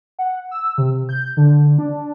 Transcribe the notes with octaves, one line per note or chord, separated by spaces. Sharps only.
F#5
E6
C3
G6
D3
D4